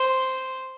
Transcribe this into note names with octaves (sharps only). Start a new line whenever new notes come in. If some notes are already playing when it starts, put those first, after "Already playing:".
Already playing: C5